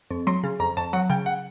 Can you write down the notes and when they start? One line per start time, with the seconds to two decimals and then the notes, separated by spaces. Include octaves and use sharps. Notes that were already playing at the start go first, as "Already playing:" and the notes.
0.10 F2
0.27 F#3 C6
0.44 C#3
0.59 F2 A#5
0.77 F2 A5
0.93 F#3 F#5
1.10 C#3 G5
1.26 F#5